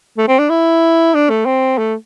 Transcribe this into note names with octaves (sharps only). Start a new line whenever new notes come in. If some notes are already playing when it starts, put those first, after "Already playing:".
A3
C4
D4
E4
D4
A3
C4
A3